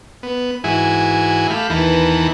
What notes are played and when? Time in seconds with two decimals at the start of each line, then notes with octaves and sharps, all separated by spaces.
0.23 B3
0.64 G#2 E3 E4 F#4 G#4 G#5
1.50 A3 G4 F5 B5
1.70 E2 D#3 E3 B4 A5 A#5